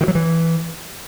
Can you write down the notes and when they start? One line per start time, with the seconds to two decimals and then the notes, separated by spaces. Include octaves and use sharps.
0.01 D#3
0.08 F#3
0.15 E3